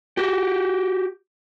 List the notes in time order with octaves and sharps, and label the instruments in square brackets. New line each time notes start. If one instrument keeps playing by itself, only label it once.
[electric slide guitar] F#4 G4